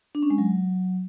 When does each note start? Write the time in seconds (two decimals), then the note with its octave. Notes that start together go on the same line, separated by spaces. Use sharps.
0.15 D4
0.23 C#4
0.30 G#3
0.38 F#3